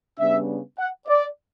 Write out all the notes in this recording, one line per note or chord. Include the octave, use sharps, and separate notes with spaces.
C#3 G3 B3 D4 E5
F#5
D5